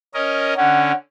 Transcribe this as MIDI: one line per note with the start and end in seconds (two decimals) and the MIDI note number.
0.14 0.54 61
0.14 0.54 70
0.14 0.54 75
0.57 0.92 50
0.57 0.92 61
0.57 0.96 78